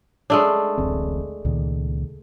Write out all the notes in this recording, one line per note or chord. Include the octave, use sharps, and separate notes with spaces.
G#3 A3 D4
D1 A1 C4
C#2 A#2 D#3